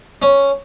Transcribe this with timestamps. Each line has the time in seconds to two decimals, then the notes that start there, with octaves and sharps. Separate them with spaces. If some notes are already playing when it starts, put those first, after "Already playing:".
0.22 C#4